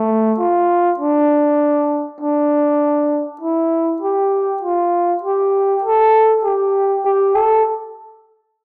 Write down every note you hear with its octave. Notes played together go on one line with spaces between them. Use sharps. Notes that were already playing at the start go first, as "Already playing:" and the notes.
Already playing: A3
F4
D4
D4
E4
G4
F4
G4
A4
G4
G4
A4